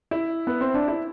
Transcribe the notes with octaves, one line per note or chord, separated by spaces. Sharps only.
E4
B3
C4
D4
E4